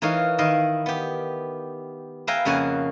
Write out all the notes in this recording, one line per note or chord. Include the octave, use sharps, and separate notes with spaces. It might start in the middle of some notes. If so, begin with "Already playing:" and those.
E3 D#4 A#4 C#5 F5
D#3 E4 D#5 F5
B3 G4
B4 E5 F5 G5 G#5 A#5
F2 C#3 A#3 C#4 F#5 G#5